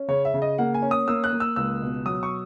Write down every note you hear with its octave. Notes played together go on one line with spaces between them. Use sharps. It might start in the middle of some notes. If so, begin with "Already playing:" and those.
Already playing: C#4
C#3 C#5
E5
C#3
D#5
A#3 F#5
G#5
C#4
D#6
A#3 E6
F#6
A#3
E6
C#2 E6
B2
F#3 D#6
C#6